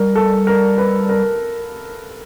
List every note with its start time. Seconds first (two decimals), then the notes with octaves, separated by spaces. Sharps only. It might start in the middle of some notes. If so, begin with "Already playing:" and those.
Already playing: G3 A#4
0.16 A4
0.47 A#4
0.78 B4
1.09 A#4